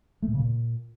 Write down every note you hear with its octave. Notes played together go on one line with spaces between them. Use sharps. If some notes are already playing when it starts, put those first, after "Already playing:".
A3
A#2
C#3
A#2